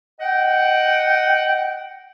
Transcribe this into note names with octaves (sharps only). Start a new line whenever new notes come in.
D#5 F#5 G5